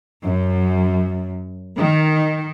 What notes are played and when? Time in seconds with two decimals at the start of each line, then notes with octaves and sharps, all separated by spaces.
0.23 F#2
1.78 D#3